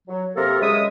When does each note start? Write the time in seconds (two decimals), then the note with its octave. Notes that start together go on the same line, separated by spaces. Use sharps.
0.08 F#3
0.35 C3 A#3 A4 A#4
0.61 C#3 F#3 G#3 E5 D#6